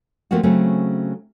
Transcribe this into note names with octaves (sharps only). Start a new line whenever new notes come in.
F3 A3 A#3 C4 F#4
C#3 F#3 A3 C4 C#4